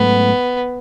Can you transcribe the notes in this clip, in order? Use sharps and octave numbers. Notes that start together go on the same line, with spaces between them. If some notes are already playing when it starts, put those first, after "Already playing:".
Already playing: G#2 F#3 A3 B3 C#4